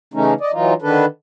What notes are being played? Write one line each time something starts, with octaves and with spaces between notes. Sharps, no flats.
C#3 E3 A3 C#4 D#4
D5 D#5
E3 F#3 D#4 F4
D3 D#3 D4 A4 B4